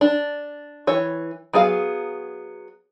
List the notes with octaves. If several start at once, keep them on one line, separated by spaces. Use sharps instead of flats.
D4
E3 C#5
F#3 B3 G#4 F5